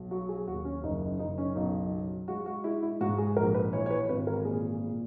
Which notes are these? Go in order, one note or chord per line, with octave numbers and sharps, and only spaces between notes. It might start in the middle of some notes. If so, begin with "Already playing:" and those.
Already playing: B1
F#3 F#4
G#4
D#2 F#4
C#4
F#1 D#4
F#1 D#4
C#4
B1 D#4
F#3
G#3 F#4
F#4
G#3 E4
E4
G#2 F#4
G#4
A#1 A#4
B4
E3 C#5
C#5
B4
G#1 B4
A#4
A#2 G#4
A#2